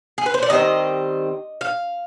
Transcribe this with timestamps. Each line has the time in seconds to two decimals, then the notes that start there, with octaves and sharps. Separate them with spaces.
0.18 G#4
0.26 B4
0.34 C5
0.43 D5
0.50 D#3 G3 C4 D#5
1.61 F5